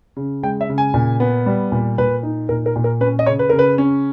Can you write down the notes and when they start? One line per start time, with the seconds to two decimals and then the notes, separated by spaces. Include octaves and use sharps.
0.16 C#3
0.43 G#3 G5
0.61 E5
0.69 C#3
0.78 G#5
0.94 A#2
1.20 B3
1.46 G3
1.72 A#2
1.98 A#2 B4
2.23 D#4
2.49 A#2 A#4
2.66 A#4
2.76 A#2
2.84 A#4
3.00 C#4 B4
3.19 D#5
3.26 C#3 C#5
3.39 B4
3.49 C#3 A#4
3.59 B4
3.78 C#4